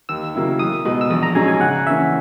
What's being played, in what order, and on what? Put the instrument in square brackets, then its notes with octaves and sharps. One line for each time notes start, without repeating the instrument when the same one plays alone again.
[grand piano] D#2 [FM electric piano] E6
[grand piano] C#3 F#3 A#3 E4
[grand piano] B1 [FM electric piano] D#6
[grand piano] B2 G#3
[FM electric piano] E6
[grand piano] A#1 [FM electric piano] D#6
[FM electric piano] A#5
[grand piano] G#2 F#3 C#4 G#4 [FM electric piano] G#5
[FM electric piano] G#5
[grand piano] C#3 [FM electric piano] F#5
[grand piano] E3 A#3 C#4 [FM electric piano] E5